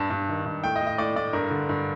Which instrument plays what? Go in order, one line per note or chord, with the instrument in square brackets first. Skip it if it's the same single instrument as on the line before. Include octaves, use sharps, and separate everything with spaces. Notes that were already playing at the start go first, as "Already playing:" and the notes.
Already playing: [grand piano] G2 A5
G2
D#3
G2
A2 G5
D#5
A2
D#5
A2 D5
A2 D5
G2 A#4
D3
G2